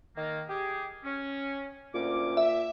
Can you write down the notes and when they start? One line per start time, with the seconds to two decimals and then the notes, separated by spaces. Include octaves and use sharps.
0.15 D#3 A#3
0.47 G4 G#4
1.04 C#4
1.94 D2 A#2 C#4 D6
2.37 E5